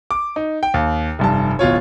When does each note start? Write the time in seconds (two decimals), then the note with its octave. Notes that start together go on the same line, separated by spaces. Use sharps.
0.11 D6
0.36 D#4
0.63 G5
0.74 D#2
1.19 F1 G2 A5
1.59 D1 B2 F4 C#5